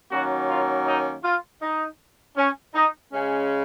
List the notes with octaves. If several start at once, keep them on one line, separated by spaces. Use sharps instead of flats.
D#3 F#3 A#3 C#4 F#4
F4
D#4
F4
D#4
C#4
D#4
C#3 G#3 C#4